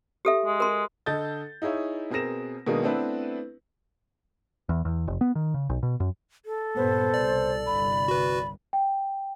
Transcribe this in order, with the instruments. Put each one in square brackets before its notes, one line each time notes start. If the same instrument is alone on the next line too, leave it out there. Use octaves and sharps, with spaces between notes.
[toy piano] G4 A4 E5
[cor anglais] G#3
[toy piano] A#4 C6
[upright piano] D3 A4 D#5 G6 A6
D#4 E4 G#4 C#5 E5
B2 C4 G#4 A#4 A#6 E7
B2 D#3 G#3 A#3 D4 G#4
A3 B3 C4 D4 E4 B4
[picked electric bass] E2
E2
F1
B3
D#3
C#3
B1
B2
F#2
[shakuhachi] A4
[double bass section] G2 A#2 B3 [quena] C5
[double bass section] C2 B2 [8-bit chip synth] D5
[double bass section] G1 C2 [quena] B5
[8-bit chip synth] F#4 B4 [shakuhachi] D5
[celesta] G5